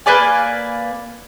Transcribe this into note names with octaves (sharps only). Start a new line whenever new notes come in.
A#3 B4 D5 G#5